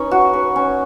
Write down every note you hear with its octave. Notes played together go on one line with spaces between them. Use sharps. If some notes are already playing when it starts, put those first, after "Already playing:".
Already playing: C#4 D#4 B4
F#4
B4
C#4